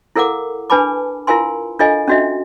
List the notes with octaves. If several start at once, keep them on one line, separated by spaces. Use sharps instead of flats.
E4 A4 A#4 F5 F#5 D6
D4 B4 G#5 A5 B5 D6
E4 F4 A#4 F5 G#5 C6
D4 F4 A4 D#5 F5 G#5
C#4 D4 F#4 D#5 E5